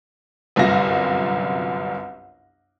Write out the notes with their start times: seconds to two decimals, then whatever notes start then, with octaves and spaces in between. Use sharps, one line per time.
0.56 G1 C2 F#2 F4 A#6